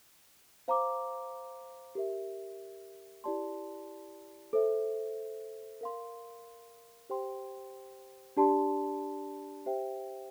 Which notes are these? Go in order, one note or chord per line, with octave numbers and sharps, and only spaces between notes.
C5 F5 A#5 D6
G4 A#4 E5
E4 G4 D5 A5 C6
A4 C5 E5
A#4 F5 C6
G4 C5 G5 C6
D4 G4 D5 A5 C6
G4 C5 E5 G5